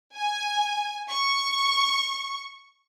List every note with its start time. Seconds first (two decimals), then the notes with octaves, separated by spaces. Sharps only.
0.15 G#5
1.09 C#6